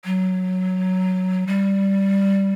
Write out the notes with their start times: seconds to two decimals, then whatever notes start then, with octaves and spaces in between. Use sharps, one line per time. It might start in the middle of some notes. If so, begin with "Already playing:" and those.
0.05 F#3
1.47 G3